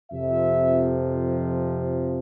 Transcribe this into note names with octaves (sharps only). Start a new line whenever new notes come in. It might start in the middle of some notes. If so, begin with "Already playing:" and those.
F2 C3 F3 E5